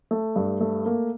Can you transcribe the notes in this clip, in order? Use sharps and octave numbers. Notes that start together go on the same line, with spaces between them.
A3
G2
A3
A#3